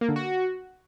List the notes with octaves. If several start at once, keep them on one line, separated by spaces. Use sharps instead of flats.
A#3
D3
F#4